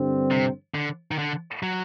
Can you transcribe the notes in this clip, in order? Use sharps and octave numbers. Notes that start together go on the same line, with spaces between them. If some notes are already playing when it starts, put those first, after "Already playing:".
Already playing: G2 D3 G3 C4
C3
D3
D#3
D3
F#3